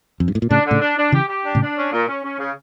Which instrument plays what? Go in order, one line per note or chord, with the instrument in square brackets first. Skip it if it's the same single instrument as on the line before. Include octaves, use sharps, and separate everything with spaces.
[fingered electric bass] F2
G2
A2
A#2
[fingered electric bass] A2 C#3 [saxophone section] D4
[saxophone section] D3
[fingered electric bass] A2 C#3
[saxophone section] D4
D4
[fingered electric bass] C#3 E3 [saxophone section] G4
[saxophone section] G4
D4
[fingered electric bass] A2 C#3
[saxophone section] D4
C#4
A#2
C#4
C#4
C#3